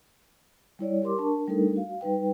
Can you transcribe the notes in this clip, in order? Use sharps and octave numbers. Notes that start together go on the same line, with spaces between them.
G3 E4 C#5 D5
G4 A#4 C6 D6
D4 A#4 A5 C#6
G3 A3 D4 D#4 A4 A#4
F#4 F5
G3 D#4 B4 G5